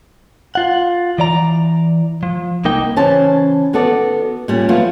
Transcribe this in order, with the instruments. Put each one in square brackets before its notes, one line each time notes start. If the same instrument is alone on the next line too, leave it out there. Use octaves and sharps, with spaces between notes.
[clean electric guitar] F4 F#5
E3 D5 A#5
F3
C2 A#3 D#4 G5
[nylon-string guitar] C#3 E3 C#4 C5 A5
D#3 B3 F#4 A4 D5
A#2 G3 C#4
F3 F#3 A3 B3 F4